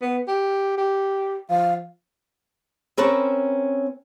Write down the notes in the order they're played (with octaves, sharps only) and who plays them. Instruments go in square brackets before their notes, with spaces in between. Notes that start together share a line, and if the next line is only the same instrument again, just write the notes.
[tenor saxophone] B3
G4
G4
[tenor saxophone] F3 [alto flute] F5
[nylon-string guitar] C4 C#4 A#4 B4 C#5 A5